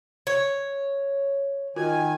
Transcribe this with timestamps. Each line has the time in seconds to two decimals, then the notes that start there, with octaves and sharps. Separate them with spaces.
0.27 C#5
1.76 D#3 F4 F#4 A#4 G#5